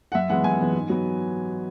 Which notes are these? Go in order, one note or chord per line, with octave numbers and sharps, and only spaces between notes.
F#5
F#2 E5
E3 G#3 B3 F#5
F#2 G#5
E3 G#3 B3
G#2
F#3 B3